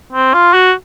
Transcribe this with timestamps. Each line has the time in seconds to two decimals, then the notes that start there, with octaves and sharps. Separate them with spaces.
0.12 C4
0.33 F4
0.53 F#4